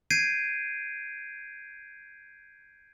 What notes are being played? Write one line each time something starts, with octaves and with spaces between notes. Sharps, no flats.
G6 G#6 C7 D7 D#7